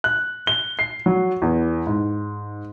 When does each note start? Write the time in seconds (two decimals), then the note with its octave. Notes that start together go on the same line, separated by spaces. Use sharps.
0.04 F#6
0.47 G7
0.79 C7
1.06 F#3
1.42 E2
1.87 G#2